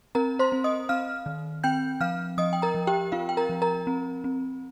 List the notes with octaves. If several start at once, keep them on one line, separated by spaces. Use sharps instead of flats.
C4 A#4 A#5
C5 C6
C4
D#5 D#6
C4 F5 F6
D#3
C4 G5 G6
F3 F5 F6
F3 D#5 D#6
G5
A#4 A#5
F3
G4 G5
C4 F4 F5
G5
A#4 A#5
F3
A#4 A#5
C4
C4